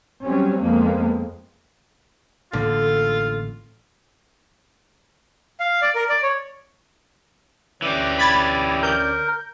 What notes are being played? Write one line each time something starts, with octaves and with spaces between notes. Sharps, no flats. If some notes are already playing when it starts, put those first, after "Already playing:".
F#3 G3 C4 C#4
F2 F3 G#3 A#3 B3
A1 A2 D3 A#3 F4 A4
F5
D5
A#4
D5
C#5
D2 E3 C#4 G4 D5
B5 G#6 A6
A#4 G6